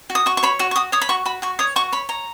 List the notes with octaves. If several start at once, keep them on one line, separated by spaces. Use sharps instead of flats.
F#4
D#6
F#4 C#6
C#6
C#5 B5
F#4 C#6
C#6
F#4 D#6
C#5 D#6
B5
F#4 C#6
F#4 B5
F#4 C#6
C#5 D#6
F#4 C#6
C#5 B5
C#5 A#5